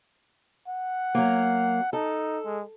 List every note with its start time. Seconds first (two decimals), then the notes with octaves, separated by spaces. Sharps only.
0.68 F#5
1.15 F#3 A#3
1.93 D#4 A4
2.45 G#3